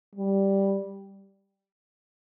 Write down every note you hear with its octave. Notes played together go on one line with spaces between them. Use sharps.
G3